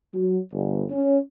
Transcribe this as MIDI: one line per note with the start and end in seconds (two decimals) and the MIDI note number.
0.14 0.39 54
0.52 0.83 31
0.90 1.18 61